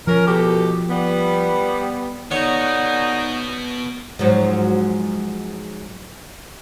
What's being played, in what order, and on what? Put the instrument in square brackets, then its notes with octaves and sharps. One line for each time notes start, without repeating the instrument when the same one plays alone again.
[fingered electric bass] F3 [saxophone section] C#4 A#4
[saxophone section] B2 G4 A4
G3 B3
[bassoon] D3 [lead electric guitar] B3 F#4 [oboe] D#4 [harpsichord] C#5
[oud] G#2 F3 F#3